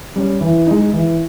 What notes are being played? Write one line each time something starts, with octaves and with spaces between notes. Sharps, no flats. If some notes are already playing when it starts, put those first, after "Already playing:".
G3 C#4
E3
G#3 D#4
E3